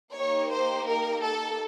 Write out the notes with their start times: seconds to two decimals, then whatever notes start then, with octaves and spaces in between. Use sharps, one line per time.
0.15 A#3 D#4 G4 C#5
0.51 C5
0.87 A#4
1.22 A4